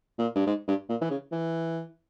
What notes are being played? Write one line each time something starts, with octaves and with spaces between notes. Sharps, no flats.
A#2
G2
G#2
G2
A#2
E3
C#3
E3